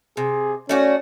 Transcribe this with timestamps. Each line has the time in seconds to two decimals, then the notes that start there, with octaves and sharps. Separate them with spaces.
0.17 C3 G#4
0.69 A3 C#4 F#4 D5